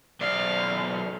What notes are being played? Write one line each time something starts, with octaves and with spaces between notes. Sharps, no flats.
B1 D5 F5